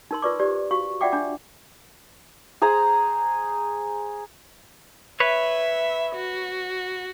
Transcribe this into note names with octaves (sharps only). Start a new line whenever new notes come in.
D#4 A#4 C6
F4 A#4 B4 D5 C#6 D6
G4 C5 D5
F#4 F5 C#6
F4 D5 E5 F#5 G5 D6
D4 D6
G#4 C5 A#5 D#6
B4 C#5 E5
F#4